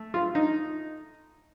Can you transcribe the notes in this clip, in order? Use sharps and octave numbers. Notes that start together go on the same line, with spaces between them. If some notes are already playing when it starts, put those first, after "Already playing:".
Already playing: A3
F4
D#4